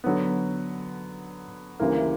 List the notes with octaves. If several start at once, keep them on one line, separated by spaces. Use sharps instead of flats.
D3 F#3 B3
D2 C#3 E3 G3 A#3